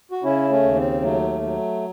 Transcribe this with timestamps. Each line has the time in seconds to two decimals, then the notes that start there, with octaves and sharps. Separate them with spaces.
0.11 F#4
0.23 C#3 C#4 E4
0.50 A3 C#4
0.63 D#2
0.75 C4
1.02 F#3 A3
1.42 F#3